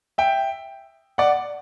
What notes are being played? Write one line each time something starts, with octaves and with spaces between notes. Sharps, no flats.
E5 G5
D5 F#5